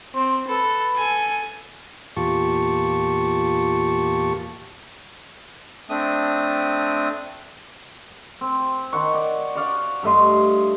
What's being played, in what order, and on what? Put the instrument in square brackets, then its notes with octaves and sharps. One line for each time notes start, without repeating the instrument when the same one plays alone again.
[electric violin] C4 [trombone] C5
[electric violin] A4 [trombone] B4
[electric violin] A4 G#5
[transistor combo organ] E2 A#2 F4 G4 A5 C#6
[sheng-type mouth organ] A3 C4 D4 D#6
[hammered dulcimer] C4
D#3 F#5 C#6
D5
F#4 C#5 D5 F5
G2 A3 D#5 C6